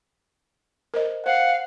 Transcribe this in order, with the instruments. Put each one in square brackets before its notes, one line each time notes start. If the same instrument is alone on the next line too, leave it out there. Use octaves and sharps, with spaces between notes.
[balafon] A#4 C5 D#5
[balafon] C5 [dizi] F5 [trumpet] F#5